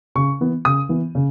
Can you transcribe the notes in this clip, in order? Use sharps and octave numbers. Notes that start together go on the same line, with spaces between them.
C#3 C#6
E3 B3
C#3 D#6
E3 B3
C#3